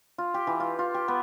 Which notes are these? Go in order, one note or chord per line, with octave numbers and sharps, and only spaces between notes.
F4
G4
E3
F4
F4
G4
B3